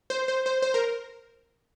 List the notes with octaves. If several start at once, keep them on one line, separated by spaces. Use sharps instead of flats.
C5
C5
C5
C5
A#4